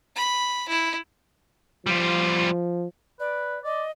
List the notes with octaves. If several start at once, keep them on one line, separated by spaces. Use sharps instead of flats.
B5
E4
F3 G3 F4
B4 D5
D5 D#5